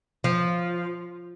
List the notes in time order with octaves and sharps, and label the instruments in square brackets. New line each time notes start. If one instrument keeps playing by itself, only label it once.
[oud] F3